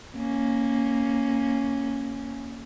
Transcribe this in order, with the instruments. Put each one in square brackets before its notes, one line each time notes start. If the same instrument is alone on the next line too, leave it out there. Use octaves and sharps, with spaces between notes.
[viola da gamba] A#3 C#4